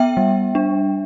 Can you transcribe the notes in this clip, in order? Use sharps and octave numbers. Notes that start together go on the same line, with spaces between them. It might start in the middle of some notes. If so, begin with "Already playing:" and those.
Already playing: B3 E5 G5
G3
D4